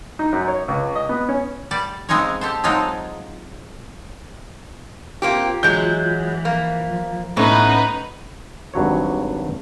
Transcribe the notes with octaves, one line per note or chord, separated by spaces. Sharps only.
D#4
F#2
C#5
C#2
D#5
B3
C#4
G3 D5
C#3 G#3 C4 C#4 D#4 C#5
G4 A4 C5
F3 F#3 G#3 C4 D#4 F4
A#3 C4 F4 G4
E3 F#3 G#3 G6
F3 A#3
A2 B3 C#4 D#4 B4
G#1 G2 F#3 C#5